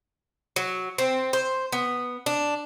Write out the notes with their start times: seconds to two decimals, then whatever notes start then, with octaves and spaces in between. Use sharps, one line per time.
0.56 F#3
0.98 C4
1.33 C5
1.72 B3
2.26 D4